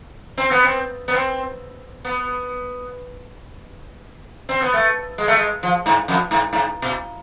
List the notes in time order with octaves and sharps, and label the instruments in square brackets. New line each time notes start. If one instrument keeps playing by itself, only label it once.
[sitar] C4
B3
C4
B3
C4
B3
C4
B3
A3
G#3
A3
G#3
F3
G#2
F2
G#2
G#2
B2